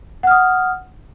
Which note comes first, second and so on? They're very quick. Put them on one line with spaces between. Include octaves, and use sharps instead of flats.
F#5 F6 D#6